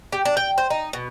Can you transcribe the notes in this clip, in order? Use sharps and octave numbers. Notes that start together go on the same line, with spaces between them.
G4
D4
G5
C5
D#4
B2